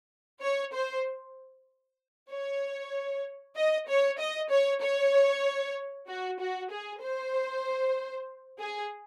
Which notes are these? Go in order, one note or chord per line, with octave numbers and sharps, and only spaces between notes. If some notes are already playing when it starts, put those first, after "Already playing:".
C#5
C5
C#5
D#5
C#5
D#5
C#5
C#5
F#4
F#4
G#4
C5
G#4